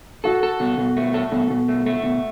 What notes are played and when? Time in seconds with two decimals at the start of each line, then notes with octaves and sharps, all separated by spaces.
0.24 F#4 A4
0.43 A4
0.60 B2
0.78 B2
0.97 A3
1.14 A4
1.32 B2
1.50 B2
1.68 A3
1.86 A3
2.03 B2